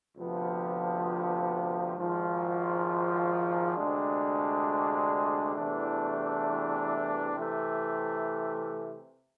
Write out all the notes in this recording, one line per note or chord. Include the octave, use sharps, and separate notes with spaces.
D2 C3 F3 B3
G#1 G#2 F3
D2 C3 G#3 D4
E2 C3 E3 A3 D4
C3 E3 A3